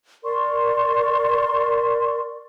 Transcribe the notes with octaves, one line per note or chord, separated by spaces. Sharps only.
A#4 D5 C6 C#6